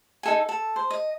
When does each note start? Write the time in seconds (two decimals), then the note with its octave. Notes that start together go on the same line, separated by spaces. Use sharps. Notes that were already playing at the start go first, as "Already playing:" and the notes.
0.23 D#4 A4 G#5
0.49 A4
0.76 C5
0.91 D#5